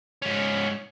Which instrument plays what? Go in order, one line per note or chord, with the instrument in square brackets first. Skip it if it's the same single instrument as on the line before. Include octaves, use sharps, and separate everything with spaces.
[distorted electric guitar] G#2 C#4